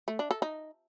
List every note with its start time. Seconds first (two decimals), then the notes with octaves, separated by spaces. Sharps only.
0.08 A3
0.19 D4
0.31 A4
0.42 D#4